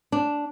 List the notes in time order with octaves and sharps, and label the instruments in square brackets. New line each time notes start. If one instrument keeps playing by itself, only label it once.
[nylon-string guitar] D4